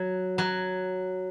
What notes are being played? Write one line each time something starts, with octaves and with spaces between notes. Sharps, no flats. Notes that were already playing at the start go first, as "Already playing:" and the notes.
Already playing: F#3
F#3